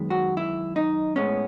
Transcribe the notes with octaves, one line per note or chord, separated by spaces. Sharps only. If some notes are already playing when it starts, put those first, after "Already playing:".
Already playing: F#2 D#3 G#3 B3
F#4
E4
D#4
A2 G#3 B3 C#4